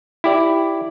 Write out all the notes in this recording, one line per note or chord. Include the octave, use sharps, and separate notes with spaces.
E4 G4 D5